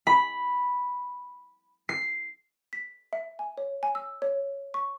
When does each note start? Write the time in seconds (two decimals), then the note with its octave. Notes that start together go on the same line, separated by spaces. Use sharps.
0.07 B5
1.89 C7
2.73 B6
3.13 E5
3.39 G#5
3.58 C#5
3.83 G#5
3.95 E6
4.22 C#5
4.74 C#6